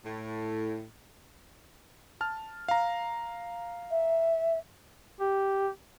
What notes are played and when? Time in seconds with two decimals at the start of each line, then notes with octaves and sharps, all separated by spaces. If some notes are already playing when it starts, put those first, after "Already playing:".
0.04 A2
2.21 A5 F6
2.68 F5 A#5
3.91 E5
5.20 G4